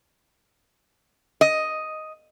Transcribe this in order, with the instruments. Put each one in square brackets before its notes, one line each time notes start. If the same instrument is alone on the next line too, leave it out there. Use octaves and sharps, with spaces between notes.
[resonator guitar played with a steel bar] D#5